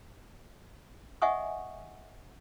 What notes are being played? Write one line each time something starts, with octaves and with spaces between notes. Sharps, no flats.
D#5 E5 F#5 G#5 C#6 D#6